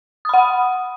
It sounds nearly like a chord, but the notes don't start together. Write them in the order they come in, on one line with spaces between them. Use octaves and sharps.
D#6 B5 F#5